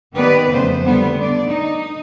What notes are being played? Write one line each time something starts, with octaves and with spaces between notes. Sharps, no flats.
D#3 B3 G4 B4 D5
F2 C#3 A3 B3 C5
D3 G3 B3
D3 D5
D#4